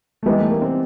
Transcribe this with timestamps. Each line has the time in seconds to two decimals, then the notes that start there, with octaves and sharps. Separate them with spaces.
0.23 A3
0.26 E3 G3 G#3 B3 D#4 G4
0.39 A3
0.50 A#3
0.62 C4